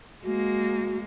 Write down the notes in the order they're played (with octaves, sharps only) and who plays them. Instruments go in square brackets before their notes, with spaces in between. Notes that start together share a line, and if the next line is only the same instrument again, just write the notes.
[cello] G#3 A#3 [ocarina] F#4